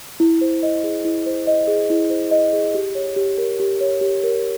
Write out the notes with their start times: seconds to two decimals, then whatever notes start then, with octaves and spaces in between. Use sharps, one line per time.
0.20 E4
0.41 C5
0.63 D#5
0.83 G#4
1.05 E4
1.26 C5
1.47 D#5
1.68 G#4
1.90 E4
2.10 C5
2.31 D#5
2.53 G#4
2.75 G4
2.95 C#5
3.16 G4
3.38 A#4
3.60 G4
3.81 C#5
4.01 G4
4.23 A#4